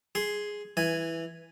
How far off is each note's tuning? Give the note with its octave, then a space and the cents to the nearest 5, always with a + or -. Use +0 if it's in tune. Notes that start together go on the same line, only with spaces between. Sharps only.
G#4 +0 C6 +0
E3 +0 G#5 +0